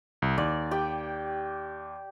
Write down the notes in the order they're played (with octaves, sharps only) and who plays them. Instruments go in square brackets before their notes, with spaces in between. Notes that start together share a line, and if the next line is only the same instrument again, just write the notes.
[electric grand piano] C2
[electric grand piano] D#2 [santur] D5
[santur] G4 G5